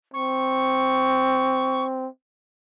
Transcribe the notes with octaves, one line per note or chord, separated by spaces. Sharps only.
C4 C#6